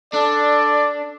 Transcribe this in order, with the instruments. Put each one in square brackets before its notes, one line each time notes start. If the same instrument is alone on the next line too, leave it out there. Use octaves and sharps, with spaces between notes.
[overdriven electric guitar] D4 [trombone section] A4 [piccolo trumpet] D5